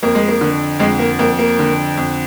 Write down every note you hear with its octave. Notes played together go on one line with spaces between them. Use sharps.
F2 A#3
G#3
A#3
D3
F2 G#3
A#3
F2 A#3
A#3
D3
F2